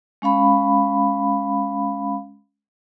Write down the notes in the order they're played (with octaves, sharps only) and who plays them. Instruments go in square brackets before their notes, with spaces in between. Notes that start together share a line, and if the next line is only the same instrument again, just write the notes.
[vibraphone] G#3 C#4 F5 B5